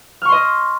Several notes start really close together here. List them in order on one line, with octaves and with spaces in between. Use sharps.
F6 C#6 C6 D#5